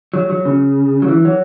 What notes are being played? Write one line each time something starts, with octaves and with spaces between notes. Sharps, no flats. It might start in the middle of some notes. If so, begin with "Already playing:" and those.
F#3
F#3
C#3
F#3
E3
F#3